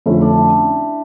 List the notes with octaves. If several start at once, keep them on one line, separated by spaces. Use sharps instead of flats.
F2 D3 A3 C#4 E4 F4
D4
E4